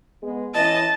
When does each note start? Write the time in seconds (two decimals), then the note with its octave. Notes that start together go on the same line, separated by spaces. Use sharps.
0.23 G#3 B3
0.55 E3 C#4 D#5 A5